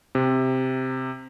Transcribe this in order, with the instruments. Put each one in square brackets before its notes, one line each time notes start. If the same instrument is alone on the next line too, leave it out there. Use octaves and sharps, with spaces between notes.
[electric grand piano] C3